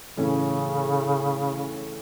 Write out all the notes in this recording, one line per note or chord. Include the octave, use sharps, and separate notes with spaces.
A2 C#3 E3 C#4